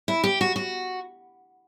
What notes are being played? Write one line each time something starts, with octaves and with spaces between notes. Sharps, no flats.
E4
G4
F#4
F#4